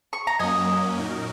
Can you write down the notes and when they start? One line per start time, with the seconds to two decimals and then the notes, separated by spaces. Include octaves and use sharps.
0.13 C#6
0.27 A#5
0.39 F#2 F#3 A#3 C#4 D#5 G#5
0.97 A#2 F#3 D#4 A#4